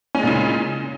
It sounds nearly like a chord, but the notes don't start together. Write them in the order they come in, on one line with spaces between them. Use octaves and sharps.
C#4 G#3 A#2 C#3